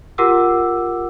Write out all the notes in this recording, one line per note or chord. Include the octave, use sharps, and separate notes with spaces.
F4 G4 A#4 F#5 D6 E6